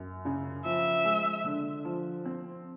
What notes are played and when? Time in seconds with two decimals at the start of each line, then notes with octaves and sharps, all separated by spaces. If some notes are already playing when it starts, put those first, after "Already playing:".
Already playing: F#2
0.25 C#3
0.64 F3 E5
1.05 G#3
1.44 D3
1.85 F3
2.25 C4